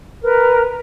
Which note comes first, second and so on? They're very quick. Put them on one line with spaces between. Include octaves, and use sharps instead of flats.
A#4 B4 A#5